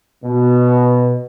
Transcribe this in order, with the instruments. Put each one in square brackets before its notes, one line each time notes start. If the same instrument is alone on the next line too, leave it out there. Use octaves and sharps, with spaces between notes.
[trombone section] B2